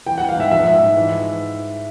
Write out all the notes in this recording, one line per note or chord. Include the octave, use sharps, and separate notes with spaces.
E3 G5
E3 F#5
F5
G#2 E5
F3 E5
G#2
G#2
E3